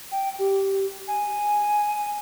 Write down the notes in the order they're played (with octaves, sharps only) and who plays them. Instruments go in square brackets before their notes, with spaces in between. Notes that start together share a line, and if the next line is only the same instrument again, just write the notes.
[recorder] G5
G4
G#5